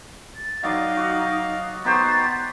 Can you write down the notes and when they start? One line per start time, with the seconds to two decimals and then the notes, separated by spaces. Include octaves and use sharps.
0.35 A6
0.63 F#3 D#4 D5 D#5 F5 D6
0.97 F#4
1.85 B3 D#4 F#4 G4 C5 A6